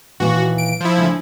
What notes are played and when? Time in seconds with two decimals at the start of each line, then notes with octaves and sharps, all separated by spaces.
0.20 D#2 A#2 E3 F#4
0.58 D7
0.80 F3 E4
0.97 D2 C#3